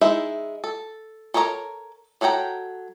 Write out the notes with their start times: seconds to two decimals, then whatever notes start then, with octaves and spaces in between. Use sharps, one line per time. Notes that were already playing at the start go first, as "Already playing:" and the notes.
0.01 G#3 D#4 E4 E5
0.64 A4
1.34 A4 A#4 C#5 D#5 A#5
2.21 F#3 A4 F#5 G5 A#5